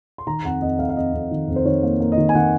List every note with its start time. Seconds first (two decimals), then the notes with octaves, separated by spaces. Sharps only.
0.18 C6
0.27 D#3 A#5
0.44 F2 F#5
0.62 F2 D#5
0.79 F2 F5
0.89 F5
0.97 F2 D#5
1.13 F2
1.31 D#3
1.48 F2
1.56 C5
1.65 D#3 C#5
1.83 A#3
2.00 A#3
2.12 D#5
2.18 D#3
2.29 G#5
2.35 D#3 F#5